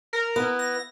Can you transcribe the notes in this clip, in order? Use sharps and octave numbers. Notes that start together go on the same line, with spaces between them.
A#4
B3 E4
A#6